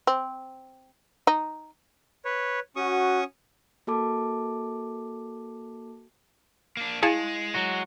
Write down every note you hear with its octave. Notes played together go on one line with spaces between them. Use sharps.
C4
D#4
B4 C#5
C#4 F#4 C#6 D#6
A#3 F#4 A4 A5 D6
A#3 D4
G#3 E4 G#4 F5 G#5 A5
F#3 F#4